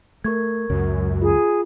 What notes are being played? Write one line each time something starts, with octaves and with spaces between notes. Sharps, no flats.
A3 A#4 C#6 G#6
C#2 F#2
F4 G#4